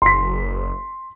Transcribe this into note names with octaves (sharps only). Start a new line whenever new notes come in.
F#1 C6 B6